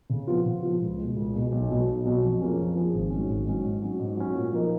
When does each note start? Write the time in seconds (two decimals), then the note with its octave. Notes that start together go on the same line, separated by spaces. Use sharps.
0.10 C#3
0.27 F3 B3 F4
0.45 C#3
0.63 F3 B3 F4
0.80 C#2
0.98 G#3
1.03 B2
1.16 C#2
1.33 B2 G#3
1.52 B1
1.69 B2 F#3
1.87 B1
2.05 B2 F#3
2.23 F2
2.40 F3 A#3 C#4 G#4
2.58 F2
2.75 F3 A#3 C#4 G#4
2.93 G#1
3.10 G#2 F#3 C#4
3.28 G#1
3.46 G#2 F#3 C#4
3.64 G#2
3.82 F#3 C#4
3.99 G#2
4.17 F#3 C#4
4.35 A#2
4.53 F3 A#3 D#4 A#4